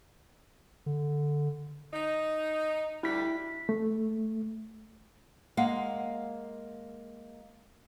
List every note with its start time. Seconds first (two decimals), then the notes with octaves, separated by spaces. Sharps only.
0.86 D3
1.93 D#4
3.03 D2 G3 E4 B6
3.69 A3
5.57 G#3 A#3 F5 F#5